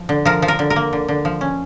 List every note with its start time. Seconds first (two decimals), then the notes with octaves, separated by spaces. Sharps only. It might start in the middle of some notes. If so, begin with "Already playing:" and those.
Already playing: F3
0.09 D3
0.25 F3 A#4
0.42 F3
0.48 A#4
0.59 D3
0.70 A#4
0.76 A#3
0.93 D3
1.08 D3
1.25 F3
1.41 C#4